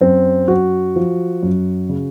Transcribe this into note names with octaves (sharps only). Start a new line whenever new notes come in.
F#2 C4
F#2 F#4
F3
F#2
C#3